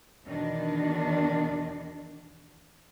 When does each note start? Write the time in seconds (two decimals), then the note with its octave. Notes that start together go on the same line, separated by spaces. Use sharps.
0.24 E2 B2 D#3 D4